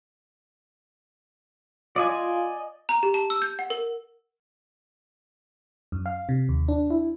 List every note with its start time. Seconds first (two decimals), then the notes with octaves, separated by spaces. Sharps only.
1.96 F4 D5 D#5 G#5
2.89 A#5
3.03 G4
3.14 A5
3.30 E6
3.42 G6
3.59 F#5
3.70 A#4
5.92 F#2
6.06 F5
6.29 C3
6.49 D#2
6.68 D4
6.90 E4